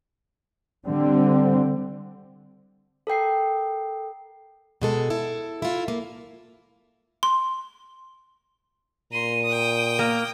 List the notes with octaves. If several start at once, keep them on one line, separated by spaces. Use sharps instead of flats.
D3 G3 C4
A4 A#4 G5 C7
B2 G#3 A4
E4 A4
E4 F4
A#3
C6
A#2 A#5 C6 D#7
G5 D#6
A#3